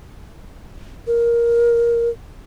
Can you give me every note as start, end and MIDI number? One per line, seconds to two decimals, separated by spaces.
1.07 2.09 70